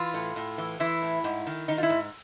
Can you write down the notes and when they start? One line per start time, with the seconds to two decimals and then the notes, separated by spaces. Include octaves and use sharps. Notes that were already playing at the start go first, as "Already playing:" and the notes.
Already playing: E3 F4
0.14 A2
0.36 A2
0.58 E3
0.80 E3 E4
1.02 A2
1.24 G#2
1.47 D#3
1.68 D#3 D#4
1.78 F4
1.83 E4
1.89 G#2